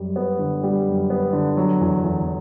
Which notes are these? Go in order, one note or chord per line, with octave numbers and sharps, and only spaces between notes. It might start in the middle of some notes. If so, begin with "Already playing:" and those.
Already playing: F#2 G3
B3
D3
G3
F#2
B3
D3
F#3
E2
E2